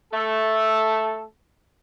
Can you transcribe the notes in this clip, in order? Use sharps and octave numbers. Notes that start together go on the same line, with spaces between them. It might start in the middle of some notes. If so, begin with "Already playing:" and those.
A3 A4